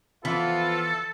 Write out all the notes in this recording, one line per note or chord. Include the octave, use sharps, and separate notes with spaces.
E3 F3 B3 F4 A4